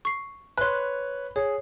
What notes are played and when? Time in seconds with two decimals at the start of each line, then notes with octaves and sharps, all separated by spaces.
0.05 C#6 C7
0.58 B4 C#5 C6 F#6
1.36 G#4 C#5